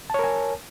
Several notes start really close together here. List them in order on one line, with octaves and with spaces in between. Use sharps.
A5 C#5 A#4 G#5